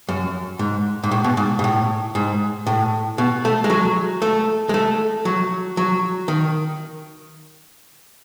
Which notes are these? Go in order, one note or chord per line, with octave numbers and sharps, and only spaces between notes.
F#2
G#2
G#2
A2
B2
G#2
G#2
A2
G#2
A2
B2
A3
G#3
F#3
A3
G#3
A3
F#3
F#3
D#3